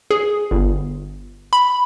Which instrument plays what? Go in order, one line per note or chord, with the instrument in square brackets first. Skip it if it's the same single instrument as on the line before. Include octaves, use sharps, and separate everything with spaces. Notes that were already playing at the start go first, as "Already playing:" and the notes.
[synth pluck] G#4
G1
B5